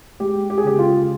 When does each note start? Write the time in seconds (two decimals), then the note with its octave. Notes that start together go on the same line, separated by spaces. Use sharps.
0.20 G#3 G4
0.50 G4
0.58 G#4
0.64 C#3 G4
0.79 F4